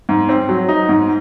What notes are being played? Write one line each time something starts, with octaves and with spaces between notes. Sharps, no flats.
G#2
C4
F#3
D#4
G#2